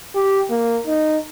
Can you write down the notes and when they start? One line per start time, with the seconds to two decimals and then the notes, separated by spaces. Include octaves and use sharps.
0.16 G4
0.51 A#3
0.87 D#4